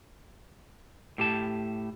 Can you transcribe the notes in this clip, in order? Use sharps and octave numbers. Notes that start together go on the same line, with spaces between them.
A2 G4 A5